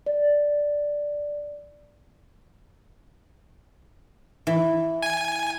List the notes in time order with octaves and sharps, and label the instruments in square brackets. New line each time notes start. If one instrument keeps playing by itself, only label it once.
[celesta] D5
[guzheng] E3
[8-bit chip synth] G#5